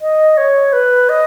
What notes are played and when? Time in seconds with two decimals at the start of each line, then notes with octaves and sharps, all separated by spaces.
0.01 D#5
0.37 C#5
0.73 B4
1.09 D#5